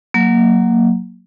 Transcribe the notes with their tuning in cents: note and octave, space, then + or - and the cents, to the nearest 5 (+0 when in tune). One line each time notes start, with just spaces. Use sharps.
F#3 -5 A#3 +0